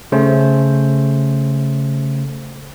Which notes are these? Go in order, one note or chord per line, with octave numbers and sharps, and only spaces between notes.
C#3 A3 C#4 C5